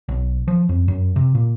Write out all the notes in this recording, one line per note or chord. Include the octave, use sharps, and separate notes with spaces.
B1
F3
F2
F#2
C3
A#2